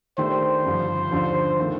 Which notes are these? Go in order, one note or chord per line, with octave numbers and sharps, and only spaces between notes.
D#3 A3 D4 G4 C5
G2 D3 F3
D#2 D3 F3
D#3 A3